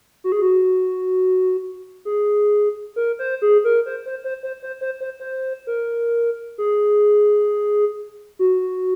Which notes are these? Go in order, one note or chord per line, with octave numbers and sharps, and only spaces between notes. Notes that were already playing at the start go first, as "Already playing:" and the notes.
F#4
G#4
F#4
G#4
A#4
C5
G#4
A#4
C5
C5
C5
C5
C5
C5
C5
C5
A#4
G#4
F#4